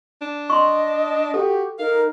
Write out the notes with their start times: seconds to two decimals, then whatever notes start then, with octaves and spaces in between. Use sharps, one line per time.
0.22 D4
0.50 D#5 C6 C#6
1.34 F#4 G4 A4
1.79 D#4 A#4 F5